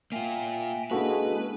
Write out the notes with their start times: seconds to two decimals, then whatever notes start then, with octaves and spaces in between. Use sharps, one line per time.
0.12 A#3 F4 E5 G5 G#5
0.91 G#3 A#3 C#4 D4 E4 F#4 A4 B4